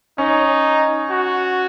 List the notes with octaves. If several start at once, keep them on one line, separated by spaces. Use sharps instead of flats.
C#4 D#4
F#4